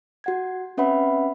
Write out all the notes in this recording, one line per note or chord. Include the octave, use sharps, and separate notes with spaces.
F#4 F#5 G#6
C4 C#4 B4 E5 F#5 B5